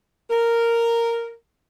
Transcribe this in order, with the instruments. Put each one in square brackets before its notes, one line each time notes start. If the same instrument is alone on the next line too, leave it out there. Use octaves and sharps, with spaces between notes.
[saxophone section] A#4